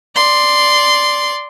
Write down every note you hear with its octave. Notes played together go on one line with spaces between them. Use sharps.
D5 C6